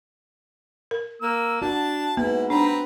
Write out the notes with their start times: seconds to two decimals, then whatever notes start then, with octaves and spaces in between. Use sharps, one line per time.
0.91 A#4
1.22 A#3 E6
1.62 D4 F#4 A5
2.17 G#2 A#3 B3 E4
2.50 C4 D4 B4 A#5